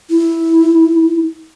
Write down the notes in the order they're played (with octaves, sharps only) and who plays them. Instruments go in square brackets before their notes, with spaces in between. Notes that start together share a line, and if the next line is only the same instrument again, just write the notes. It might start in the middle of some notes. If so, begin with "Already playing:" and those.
[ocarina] E4